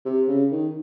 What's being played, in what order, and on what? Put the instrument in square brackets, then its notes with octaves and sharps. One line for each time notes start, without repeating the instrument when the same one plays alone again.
[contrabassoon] C3
C#3
D#3